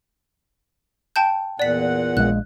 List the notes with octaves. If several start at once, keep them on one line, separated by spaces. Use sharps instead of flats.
G5 A5 G6
E2 A#2 D5 F#5 B6
A#1 G#3 F#6